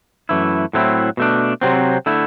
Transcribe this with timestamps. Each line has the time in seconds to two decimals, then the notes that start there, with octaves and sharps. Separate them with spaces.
0.29 F#2 E3 A3 E4
0.73 A2 F#3 A3 C4 E4
1.17 B2 A3 D4
1.61 C3 F#3 C4
2.06 D3 A3 E4